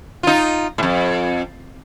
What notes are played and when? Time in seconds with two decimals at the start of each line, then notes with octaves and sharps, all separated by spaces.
0.23 D#4 F4
0.78 F2 A2